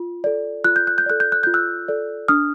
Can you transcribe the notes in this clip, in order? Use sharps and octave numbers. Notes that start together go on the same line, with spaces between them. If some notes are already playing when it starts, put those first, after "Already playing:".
Already playing: F4
A4 D5
F4 F#6
G6
F#6
G6
A4 D5 F#6
G6
F#6
F4 G6
E6 F#6
A4 D5
D4 D#6 F6